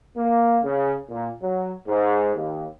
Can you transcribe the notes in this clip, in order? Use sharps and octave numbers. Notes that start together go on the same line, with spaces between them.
A#3
C#3
A#2
F#3
G#2
D#2